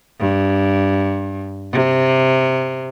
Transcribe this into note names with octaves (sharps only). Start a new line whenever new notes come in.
G2
C3